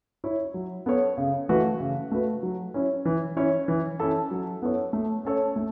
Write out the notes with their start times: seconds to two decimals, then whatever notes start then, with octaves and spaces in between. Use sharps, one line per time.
0.24 E4 C#5
0.54 F#3
0.86 B3 A4 C#5
1.18 C#3
1.49 E3 A3 F#4 B4
1.80 C#3
2.12 A3 F#4 B4
2.43 F#3
2.74 C#4 E4 C#5
3.05 E3
3.37 C#4 E4 C#5
3.68 E3
4.00 C#4 E4 A4
4.31 F#3
4.62 B3 E4 A4 C#5
4.93 A3
5.25 C#4 A4 C#5
5.56 A3